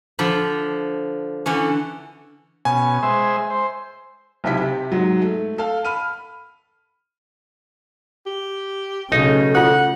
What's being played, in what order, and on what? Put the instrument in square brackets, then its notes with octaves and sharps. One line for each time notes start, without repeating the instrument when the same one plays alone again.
[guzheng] D3 F3 B5
D3 E3 C#4
[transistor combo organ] B2 C#4 [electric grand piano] G#5
[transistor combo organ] G#3 C5 E5
C5
[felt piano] B1 C3 E4 G4 B6
C3
G#2 F#3
A3
A4 F5
B5 F6 D#7
[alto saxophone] G4
[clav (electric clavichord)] B1 D#4 [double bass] C#3 A3
[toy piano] F4 A4 [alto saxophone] F#5